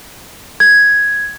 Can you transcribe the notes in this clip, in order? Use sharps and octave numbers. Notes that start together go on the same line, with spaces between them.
G#6